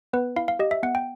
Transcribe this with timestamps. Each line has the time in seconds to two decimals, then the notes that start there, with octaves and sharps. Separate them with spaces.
0.13 B3 B4
0.36 E4 F5
0.48 F5
0.59 G4 D#5
0.71 E5
0.83 B3 F#5
0.95 G5